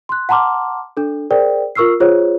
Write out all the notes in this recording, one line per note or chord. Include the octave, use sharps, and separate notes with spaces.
C6 F#6
F#5 A5 A#5 C6 D6 F6
D4 A4
G#4 A#4 C5 D5 G5
F4 A#4 C#6 E6 F6 C7
F4 G#4 C5 C#5